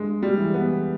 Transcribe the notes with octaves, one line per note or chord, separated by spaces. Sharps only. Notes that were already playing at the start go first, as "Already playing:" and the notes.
Already playing: G2 G#3
G3
E3
B3